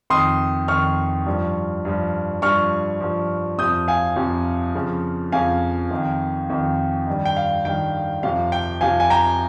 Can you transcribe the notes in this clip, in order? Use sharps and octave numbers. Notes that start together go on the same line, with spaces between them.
F2 D#3 C6 D#6
F2 D#3 C#6 F6
G2 F3
G2 F3
G2 F3 C#6 F6
G2 F3
F2 C3 F3 D#6 G6
F5 G#5
F2 C3 F3
F2 C#3 F3
F2 C#3 F3 F5 G#5
F2 D#3
F2 D#3
G2 D#3
G5
F5
G2 D#3 G5
F2 C3 F3 F5
G5
F2 C3 F3 F5 G#5
G#5
G5 A#5